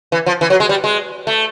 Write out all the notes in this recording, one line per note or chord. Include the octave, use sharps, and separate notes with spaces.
E3
F3
E3
F#3
G#3
G3
G#3
A3